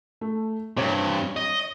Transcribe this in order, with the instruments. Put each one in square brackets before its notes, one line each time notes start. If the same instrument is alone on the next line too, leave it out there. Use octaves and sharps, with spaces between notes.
[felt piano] A3
[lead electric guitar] G2 C3 [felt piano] C#5 G#6
[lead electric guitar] D#5